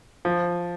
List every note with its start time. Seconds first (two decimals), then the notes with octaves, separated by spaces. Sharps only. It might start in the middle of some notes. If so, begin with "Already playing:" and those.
0.25 F3